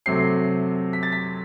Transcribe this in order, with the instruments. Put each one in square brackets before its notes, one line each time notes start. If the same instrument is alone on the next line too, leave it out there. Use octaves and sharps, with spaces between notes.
[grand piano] C3 F#3 A3 C4 C7
B6
A6
B6